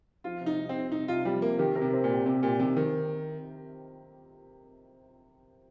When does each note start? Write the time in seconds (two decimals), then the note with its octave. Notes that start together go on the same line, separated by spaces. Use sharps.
0.24 F3 F4
0.41 C3
0.46 D#4
0.59 C2
0.69 C4
0.75 C3
0.92 C2 D#4
1.08 C3 F4
1.25 F3 G3
1.42 C3 A#3
1.59 D#3 G4
1.75 A#4
1.81 C3
1.93 C4
2.04 A#2
2.09 G4
2.26 C3 C4
2.43 A#2 G4
2.59 C3 D#3
2.77 D#3 C4